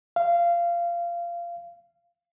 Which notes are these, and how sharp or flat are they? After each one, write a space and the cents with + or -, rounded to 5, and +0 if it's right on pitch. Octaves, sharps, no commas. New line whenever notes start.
F5 -20